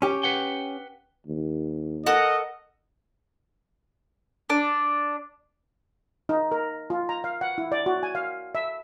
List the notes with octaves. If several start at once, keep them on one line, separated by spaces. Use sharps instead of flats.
C#4 G4
B4 F#5 G5
D#2
A4 A#4 D#5 F#5
D4
D#4
A#4
F4
A#5
F5
F#5
E4
D5
F#4
G#5
F5
E5